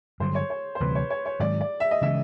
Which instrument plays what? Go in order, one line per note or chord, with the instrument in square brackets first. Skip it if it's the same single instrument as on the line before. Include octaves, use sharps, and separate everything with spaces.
[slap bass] G2 D3 F#3 [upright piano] C5
[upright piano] C#5
C#5
C5
[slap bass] D2 C3 E3 G3 [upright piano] B4
[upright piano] C#5
C#5
C#5
[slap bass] G#2 D#3 F#3 [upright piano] D5
[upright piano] D5
E5
D#5
[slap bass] C#3 E3 G#3 [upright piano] E5